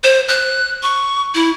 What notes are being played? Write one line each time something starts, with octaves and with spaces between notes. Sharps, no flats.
C5
F#6
C#6
E4